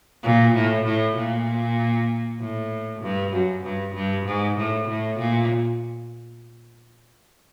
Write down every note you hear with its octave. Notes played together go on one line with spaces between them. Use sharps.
A#2
A2
A2
A#2
A2
G2
F#2
G2
G2
G#2
A2
A2
A#2